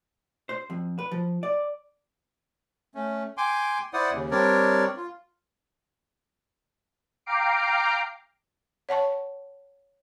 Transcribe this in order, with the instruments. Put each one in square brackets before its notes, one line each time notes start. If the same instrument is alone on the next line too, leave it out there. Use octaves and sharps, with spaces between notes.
[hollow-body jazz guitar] C5
F2
B4
F3
D5
[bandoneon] A3 C#4
G5 G#5 C6 D6
E4 C5 D5 F#5 D#6
D#2 C#3
G3 C4 D4 A#4 C#5 D5
F4
[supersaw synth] F5 G5 A#5 D6 C7 D7
[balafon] C#5 F#5 A5 C#6